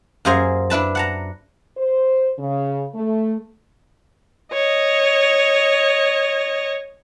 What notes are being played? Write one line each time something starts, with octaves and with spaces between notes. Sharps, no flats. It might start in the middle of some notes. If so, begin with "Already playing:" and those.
F#2 A#3 G#4 C5 G#5 A#5
D4 E4 B4 A5
F#5 A5 A#5
C5
C#3
A3
C#5 D#5